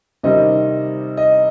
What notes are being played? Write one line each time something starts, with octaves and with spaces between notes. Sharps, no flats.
C3 D#3 G3 C4 D#5
D#5